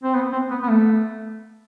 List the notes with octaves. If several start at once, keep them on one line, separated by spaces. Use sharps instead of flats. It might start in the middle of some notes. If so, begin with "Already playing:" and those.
C4
B3
C4
B3
B3
A3